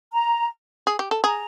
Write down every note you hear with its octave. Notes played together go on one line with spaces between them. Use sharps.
A#5
G#4
G4
A4
G#4 A#5